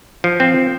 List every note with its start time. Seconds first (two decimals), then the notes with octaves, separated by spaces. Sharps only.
0.24 F3
0.40 C4